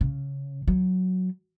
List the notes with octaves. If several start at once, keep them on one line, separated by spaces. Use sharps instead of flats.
C#3
F#3